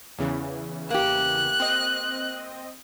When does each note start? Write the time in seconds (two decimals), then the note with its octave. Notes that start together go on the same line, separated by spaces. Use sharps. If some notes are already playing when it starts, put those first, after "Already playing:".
0.19 E2 C#3 E3
0.90 A#3 G4 F#6
1.60 C4 D#5